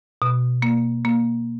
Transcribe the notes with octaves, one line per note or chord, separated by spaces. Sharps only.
B2
A#3
A#3